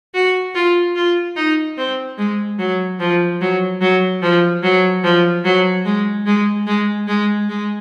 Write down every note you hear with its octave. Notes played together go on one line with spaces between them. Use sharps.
F#4
F4
F4
D#4
C4
G#3
F#3
F3
F#3
F#3
F3
F#3
F3
F#3
G#3
G#3
G#3
G#3
G#3